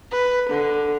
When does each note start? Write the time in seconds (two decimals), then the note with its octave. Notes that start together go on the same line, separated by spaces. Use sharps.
0.11 B4
0.50 D3